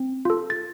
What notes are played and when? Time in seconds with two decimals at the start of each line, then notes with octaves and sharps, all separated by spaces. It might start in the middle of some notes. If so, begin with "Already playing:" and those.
Already playing: C4
0.25 F4 A4
0.50 A6